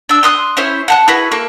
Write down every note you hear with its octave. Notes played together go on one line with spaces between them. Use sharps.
D4 E6
C6 D#6 F6 F#6
C#4 E4 C5 C#5
F#5 A5 F#6
E4 F#4 G#4 B4
A#3 A4